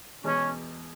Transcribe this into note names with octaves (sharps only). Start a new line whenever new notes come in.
E2 B2 G#3 C#4